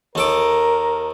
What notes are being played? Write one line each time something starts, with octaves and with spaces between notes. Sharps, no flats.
D#2 A4 A#4 D6